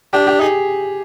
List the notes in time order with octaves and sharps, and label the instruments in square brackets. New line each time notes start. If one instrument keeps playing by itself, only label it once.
[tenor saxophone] D4 [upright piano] G4
[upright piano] G4
[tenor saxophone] D#4 [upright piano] G#4